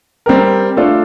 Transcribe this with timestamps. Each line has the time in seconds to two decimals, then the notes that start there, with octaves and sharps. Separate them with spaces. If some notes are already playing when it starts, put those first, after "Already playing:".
0.26 G3 C4 G4 A#4
0.77 A3 D4 F4 A4